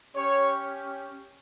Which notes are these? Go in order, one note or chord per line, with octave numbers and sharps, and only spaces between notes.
C#4 G4 C#5